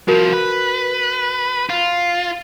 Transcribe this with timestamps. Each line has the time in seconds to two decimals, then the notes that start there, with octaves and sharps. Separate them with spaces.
0.08 C2 F3 F#4 A#4
0.33 B4
1.70 F4